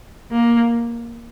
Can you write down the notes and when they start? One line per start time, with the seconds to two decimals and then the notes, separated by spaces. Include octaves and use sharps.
0.31 A#3